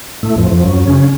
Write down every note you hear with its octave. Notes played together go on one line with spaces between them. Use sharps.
A2 A3
F2 F3
F2 F3
F#2 F#3
C#3 C#4